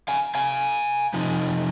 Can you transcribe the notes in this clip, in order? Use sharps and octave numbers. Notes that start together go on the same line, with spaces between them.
F5 G#5
F5 G#5
F2 C3 F3 D#4